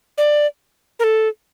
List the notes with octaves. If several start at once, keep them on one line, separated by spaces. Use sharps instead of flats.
D5
A#4
A4